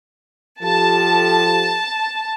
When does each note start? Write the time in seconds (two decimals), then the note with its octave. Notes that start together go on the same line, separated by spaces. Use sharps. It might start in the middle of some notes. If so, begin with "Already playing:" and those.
0.63 F3 G4 A4 A5